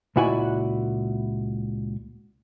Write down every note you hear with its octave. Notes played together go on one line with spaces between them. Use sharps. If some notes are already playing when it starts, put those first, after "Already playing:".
C#2 A#2 E4 F#4 G#5